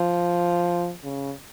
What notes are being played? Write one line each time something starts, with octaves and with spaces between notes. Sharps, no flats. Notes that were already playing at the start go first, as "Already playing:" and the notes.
Already playing: F3
C#3